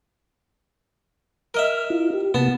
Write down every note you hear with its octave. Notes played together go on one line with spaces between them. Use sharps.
A#4 D#5 E5 F6
E4 F4
G4
C3 A#3 B3 A5